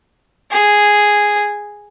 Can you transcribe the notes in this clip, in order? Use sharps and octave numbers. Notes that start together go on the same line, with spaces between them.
G#4